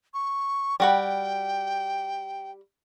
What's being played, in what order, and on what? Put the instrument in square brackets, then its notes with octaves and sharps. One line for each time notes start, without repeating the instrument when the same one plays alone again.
[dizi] C#6
[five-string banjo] G3 F#4 B5 [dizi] G5